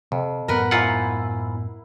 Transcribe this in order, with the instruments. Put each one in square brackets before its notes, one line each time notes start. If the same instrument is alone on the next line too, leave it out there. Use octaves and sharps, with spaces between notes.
[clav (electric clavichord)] F2 [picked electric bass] C3
[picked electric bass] F#2 A2 B3 [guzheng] A#4 B4 F#5
[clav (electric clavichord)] G#2 F4 F#5 [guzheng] E4